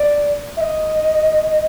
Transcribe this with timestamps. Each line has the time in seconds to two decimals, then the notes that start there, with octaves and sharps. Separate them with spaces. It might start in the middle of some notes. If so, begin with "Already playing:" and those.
Already playing: D5
0.57 E5
0.61 D#5